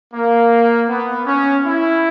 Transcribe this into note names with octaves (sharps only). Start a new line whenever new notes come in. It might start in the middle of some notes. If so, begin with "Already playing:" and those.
A#3
B3
C#4
E4